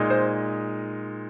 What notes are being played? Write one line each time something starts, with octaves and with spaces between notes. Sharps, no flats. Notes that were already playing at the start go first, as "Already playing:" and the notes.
Already playing: A#2 G#3 D#4
C5